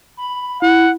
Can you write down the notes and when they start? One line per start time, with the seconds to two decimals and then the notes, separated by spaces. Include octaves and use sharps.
0.17 B5
0.62 E4 F#5